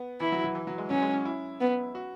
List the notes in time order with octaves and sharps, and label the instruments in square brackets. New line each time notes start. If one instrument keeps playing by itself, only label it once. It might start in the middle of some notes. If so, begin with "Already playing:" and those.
Already playing: [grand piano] B3
[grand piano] E3 [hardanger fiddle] E4
[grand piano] F#3
F#3
E3
F#3
G#3
[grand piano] F#3 [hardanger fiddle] C#4
[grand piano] G#3
C#4
E4
[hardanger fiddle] B3
[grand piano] F#4